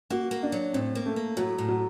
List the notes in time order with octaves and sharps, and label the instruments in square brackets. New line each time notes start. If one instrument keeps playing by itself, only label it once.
[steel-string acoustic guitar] A#3 [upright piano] F#4
[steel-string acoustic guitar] A#3
[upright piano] D4
[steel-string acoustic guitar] F#3
[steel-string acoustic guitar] A2 [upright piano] C4
[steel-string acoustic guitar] A#3
[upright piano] A3
[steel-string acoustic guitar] A#3
[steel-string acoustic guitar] A2 [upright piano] F#3
[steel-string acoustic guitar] A2
[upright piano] F#3